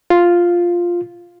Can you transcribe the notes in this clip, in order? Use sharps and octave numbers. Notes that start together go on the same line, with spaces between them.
F4